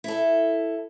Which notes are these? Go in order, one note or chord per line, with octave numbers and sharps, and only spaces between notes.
E4 A4